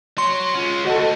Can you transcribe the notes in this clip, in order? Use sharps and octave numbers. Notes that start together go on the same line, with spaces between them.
F#4 C#5 C6
G#3 C#4 F4
D2 F#4 A4 D#5